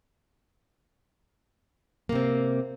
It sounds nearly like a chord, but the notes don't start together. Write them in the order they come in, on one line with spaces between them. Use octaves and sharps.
A#3 C3 C4